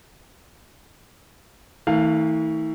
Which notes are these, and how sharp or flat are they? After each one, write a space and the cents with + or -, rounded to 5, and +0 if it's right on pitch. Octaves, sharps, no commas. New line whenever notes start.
E3 -45 A3 +30 F5 +0